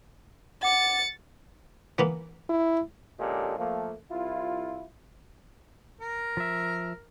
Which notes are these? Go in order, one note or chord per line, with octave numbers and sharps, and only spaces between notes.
F#5 D6 A6 C#7
E3 A#3 B3
E4
A#2 D3 G#3 C#4 G4 A4
F3 A3 A#3
C2 E4 F4
A#4
F3 E5